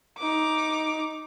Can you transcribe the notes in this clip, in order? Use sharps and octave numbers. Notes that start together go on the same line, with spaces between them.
D#4 D6